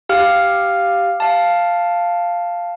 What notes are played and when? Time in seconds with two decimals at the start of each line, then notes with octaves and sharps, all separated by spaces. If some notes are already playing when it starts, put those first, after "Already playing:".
0.09 G4 F5 F6
1.20 F5 A5